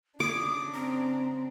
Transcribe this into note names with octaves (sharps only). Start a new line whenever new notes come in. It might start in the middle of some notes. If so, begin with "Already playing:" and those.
C#3 D4 D6 D#6
C4 A#5